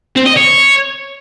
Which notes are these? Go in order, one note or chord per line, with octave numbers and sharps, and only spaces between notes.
C4
D#5
C#5